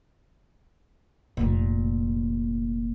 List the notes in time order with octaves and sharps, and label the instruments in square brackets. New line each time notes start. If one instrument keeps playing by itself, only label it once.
[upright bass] F1 A#2